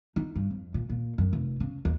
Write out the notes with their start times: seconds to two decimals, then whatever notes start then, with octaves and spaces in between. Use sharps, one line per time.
0.16 D#4
0.35 G2
0.50 F2
0.74 A#2
0.89 A#2
1.18 F#2
1.33 F1
1.60 C#3
1.85 D#2